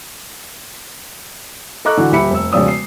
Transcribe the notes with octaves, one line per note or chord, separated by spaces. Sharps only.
A4 D#5 A#5 C#6 D6 F#6
D3 E3 F#4
D#1 G4 E5 B5 C#7
F1 E6
E1 C#3 F3 D5 D#6 E6
C7